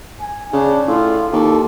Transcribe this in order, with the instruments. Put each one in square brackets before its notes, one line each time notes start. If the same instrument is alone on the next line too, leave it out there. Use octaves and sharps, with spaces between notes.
[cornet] G#5
[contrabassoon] C#3 [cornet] D4
[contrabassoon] A2 [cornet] F4
[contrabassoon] D#2 [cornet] A4